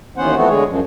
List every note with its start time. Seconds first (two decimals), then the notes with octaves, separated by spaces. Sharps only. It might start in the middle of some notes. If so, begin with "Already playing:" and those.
0.17 D#2 E3 B3 C#4 C5 F#5
0.36 E3 F3 A3 B3 C4 F#4
0.49 D3 G#3 G#4 C#5
0.69 F#2 F3